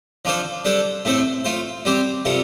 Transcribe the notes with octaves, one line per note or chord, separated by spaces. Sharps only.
F3 D4 F4 A4 C5
G3 D4 A4 C5
A2 A3 C4 A4 C5
A3 F4 C5
G3 C4 G4 C5
C3 G3 F4 A4